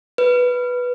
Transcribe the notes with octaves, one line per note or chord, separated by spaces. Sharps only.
B4